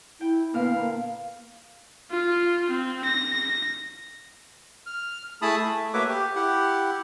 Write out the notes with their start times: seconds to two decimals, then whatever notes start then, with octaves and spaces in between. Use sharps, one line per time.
0.21 E4 G5
0.54 A#2 D3 B3 F5
0.79 A#3
2.11 F4
2.70 C4
3.04 A#6
4.86 F6
5.42 A3 E4 G#4 A5 B5 D#6
5.64 A3
5.94 A#3 F#4 B4 C#5 E5 D6
6.09 G4
6.36 E4 G4 F#5